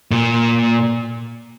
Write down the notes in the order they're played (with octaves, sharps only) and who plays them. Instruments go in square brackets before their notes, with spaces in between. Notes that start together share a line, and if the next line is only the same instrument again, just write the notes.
[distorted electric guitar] A#2